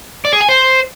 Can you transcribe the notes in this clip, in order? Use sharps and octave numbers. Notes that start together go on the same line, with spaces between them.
D5
G#4
G#5
C5